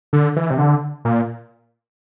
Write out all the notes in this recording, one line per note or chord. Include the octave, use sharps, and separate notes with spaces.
D3
E3
C3
D3
A#2